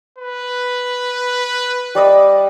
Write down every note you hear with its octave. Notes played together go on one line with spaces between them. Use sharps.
B4
G3 D5 D#5